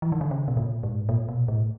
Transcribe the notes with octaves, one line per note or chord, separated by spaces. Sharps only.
E3
D#3
D3
C#3
B2
A#2
G#2
A#2
B2
A2